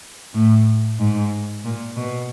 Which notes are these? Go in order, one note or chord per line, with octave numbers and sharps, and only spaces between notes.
A2
G#2
A#2
B2